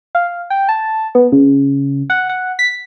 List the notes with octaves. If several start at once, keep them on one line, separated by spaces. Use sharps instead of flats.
F5
G5
A5
B3
C#3
F#5
F#5
B6